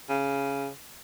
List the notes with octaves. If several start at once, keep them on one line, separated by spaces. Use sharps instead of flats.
C#3